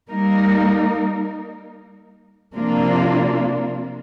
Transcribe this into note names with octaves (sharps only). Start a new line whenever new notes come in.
G3 A#3 D#4 A#4
C3 F3 A#3 D4 F4